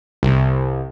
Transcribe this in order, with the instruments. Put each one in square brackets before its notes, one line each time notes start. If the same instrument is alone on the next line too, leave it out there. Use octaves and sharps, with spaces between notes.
[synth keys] C2